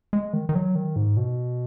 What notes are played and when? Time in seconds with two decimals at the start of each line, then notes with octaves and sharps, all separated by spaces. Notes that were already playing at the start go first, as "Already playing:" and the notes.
0.13 G#3
0.33 D#3
0.49 D#3
0.55 F#3
0.75 D#3
0.96 G#2
1.17 B2